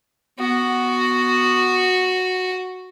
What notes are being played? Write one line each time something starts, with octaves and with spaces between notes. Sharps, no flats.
B3 F#4